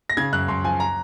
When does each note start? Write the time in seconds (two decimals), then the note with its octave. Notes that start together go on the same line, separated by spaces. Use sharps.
0.10 A#6
0.17 C#3 G#6
0.32 F#2 F#6
0.48 F#2 C6
0.64 F3 G#5
0.80 A#5